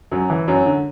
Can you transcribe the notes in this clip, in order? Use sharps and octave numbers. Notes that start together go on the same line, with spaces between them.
F#2 F#3
E3
F#2 F#3
D3